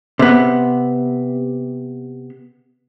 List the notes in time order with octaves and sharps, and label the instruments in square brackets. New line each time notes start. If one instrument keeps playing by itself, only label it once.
[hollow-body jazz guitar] C3 B3